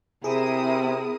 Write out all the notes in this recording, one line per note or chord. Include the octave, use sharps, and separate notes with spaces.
C3 C4 E4 G#4 A#4 D#6